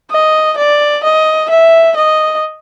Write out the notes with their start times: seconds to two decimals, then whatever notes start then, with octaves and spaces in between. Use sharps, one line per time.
0.11 D#5
0.58 D5
1.04 D#5
1.50 E5
1.96 D#5